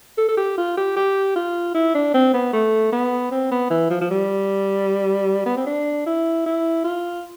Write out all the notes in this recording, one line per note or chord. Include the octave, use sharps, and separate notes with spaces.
A4
A4
G4
F4
G4
G4
F4
E4
D4
C4
B3
A3
B3
C4
B3
E3
F3
F3
G3
B3
C4
D4
E4
E4
F4